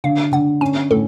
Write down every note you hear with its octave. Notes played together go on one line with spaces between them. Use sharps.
D3 F5
D3 F#5
C#4 G#5
A2 A4